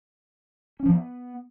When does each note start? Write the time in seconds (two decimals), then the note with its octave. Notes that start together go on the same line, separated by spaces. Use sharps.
0.80 C#4
0.86 F3
0.92 B3